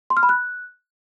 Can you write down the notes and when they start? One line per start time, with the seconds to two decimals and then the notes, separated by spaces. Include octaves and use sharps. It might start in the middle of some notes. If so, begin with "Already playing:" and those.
0.10 C6
0.17 F6
0.23 B5
0.29 F#6